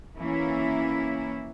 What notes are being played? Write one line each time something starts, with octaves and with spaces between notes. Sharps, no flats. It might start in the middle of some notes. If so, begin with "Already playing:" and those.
E3 A#3 C#4 E4